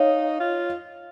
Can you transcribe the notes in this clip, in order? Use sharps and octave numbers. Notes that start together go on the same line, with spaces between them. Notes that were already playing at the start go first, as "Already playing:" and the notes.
Already playing: D#4 C#5 F5
F4